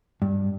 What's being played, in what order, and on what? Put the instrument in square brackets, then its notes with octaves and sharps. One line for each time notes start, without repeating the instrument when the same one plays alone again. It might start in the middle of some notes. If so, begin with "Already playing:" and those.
[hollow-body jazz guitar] G2